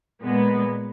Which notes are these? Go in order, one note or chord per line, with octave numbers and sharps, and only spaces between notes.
A#2 G#3 B3